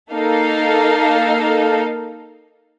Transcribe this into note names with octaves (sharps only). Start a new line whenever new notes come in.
A#3 D#4 A4 F5